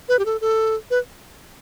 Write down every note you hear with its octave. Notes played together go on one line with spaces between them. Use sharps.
B4
G4
A4
A4
B4